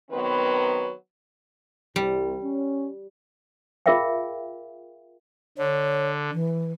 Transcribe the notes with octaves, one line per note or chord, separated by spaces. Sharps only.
D#3 F#3 B3 C4 B4
C2 G3
C#4
F4 G#4 A#4 E5 F5 G5
D3 C#5
E3